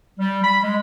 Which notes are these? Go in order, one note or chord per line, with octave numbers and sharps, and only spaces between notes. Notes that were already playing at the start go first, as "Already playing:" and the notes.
G3
B5
G#3